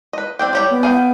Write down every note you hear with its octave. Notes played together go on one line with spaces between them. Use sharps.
B4 D#5
C4 D4 G5
G3 G4 C#5 B5
B3
G#4 F5 G5